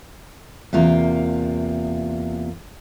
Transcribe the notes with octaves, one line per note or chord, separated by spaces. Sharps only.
E2 C3 A#3 F4 A#5